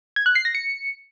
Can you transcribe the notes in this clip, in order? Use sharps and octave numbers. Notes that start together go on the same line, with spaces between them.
G#6
F#6
C7
A#6
C#7